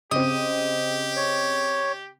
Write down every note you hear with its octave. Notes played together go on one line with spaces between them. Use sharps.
C#3 C4 G4 D#5
C#5